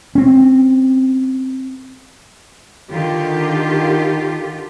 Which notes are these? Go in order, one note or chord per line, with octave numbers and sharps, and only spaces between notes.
C4 C#4
D3 D#3 F4 G4